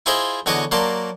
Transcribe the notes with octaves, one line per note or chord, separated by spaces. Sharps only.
E4 F4 G#4 C5 D#5 E5
E2 D3 F#4 C#5 D#5 D6
F#3 A#3 D5 A5 C6